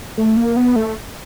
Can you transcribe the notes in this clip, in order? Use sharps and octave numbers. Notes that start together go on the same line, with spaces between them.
A3
A#3
B3
A3